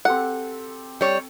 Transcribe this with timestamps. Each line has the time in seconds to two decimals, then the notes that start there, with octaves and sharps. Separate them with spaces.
0.05 C4 G4 A4 F#5
1.01 G3 C#5